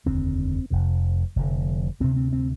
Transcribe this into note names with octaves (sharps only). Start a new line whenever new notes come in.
F1 D#2 D3 C4
F1 F2 C3
F1 F2 D3
D2 C3 C4
C4
C4